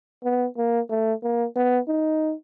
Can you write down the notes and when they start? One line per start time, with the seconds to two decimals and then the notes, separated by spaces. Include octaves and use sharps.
0.24 B3
0.57 A#3
0.90 A3
1.23 A#3
1.56 B3
1.88 D#4